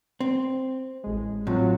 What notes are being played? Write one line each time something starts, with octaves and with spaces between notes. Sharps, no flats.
C4
A1 G#3
A2 F#3 C4 F4